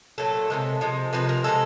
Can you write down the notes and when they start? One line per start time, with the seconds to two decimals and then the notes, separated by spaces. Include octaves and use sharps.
0.18 A#2 F#3 A3 A4
0.50 C3 F3 G#3
0.81 C3 F3 G#3
1.13 C3 F3 G#3 B4
1.29 A#4
1.44 C3 F3 G#3 A4